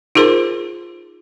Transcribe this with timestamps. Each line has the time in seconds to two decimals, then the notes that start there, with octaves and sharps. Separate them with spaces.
0.15 D#4 F4 G#4 A#4 C5 C6